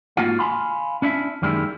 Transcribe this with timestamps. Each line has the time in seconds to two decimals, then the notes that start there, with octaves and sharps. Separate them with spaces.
0.17 G#2 A#3 F4 F#4 F5
0.39 F5 G#5 B5 C6
1.02 C#4 D4 E4 E5
1.42 F#2 D#3 G3 G#3 A#3 E4